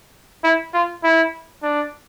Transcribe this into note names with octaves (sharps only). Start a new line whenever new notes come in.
E4
F4
E4
D4